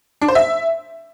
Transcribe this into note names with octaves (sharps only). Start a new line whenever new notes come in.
D4
C5
E5